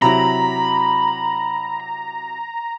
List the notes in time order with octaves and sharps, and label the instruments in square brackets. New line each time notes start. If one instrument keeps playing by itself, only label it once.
[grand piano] C3 F#3 E4 [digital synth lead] A#5 [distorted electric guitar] B5